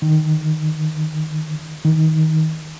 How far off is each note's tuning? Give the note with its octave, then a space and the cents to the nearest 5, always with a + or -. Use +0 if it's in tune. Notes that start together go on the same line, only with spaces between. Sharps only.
D#3 -5
D#3 +20